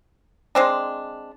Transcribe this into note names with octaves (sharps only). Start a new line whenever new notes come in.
G#3 C4 D4